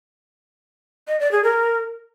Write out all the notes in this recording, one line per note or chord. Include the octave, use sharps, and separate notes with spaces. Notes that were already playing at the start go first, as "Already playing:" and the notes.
D#5
D5
G#4
A#4